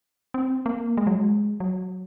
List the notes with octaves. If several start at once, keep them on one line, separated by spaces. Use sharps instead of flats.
C4
A#3
G#3
F#3
G#3
F#3